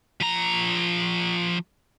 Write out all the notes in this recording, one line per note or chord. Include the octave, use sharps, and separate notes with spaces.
F3 A#5